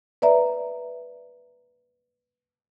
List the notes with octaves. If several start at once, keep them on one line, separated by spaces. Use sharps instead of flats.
B4 D5 E5 A#5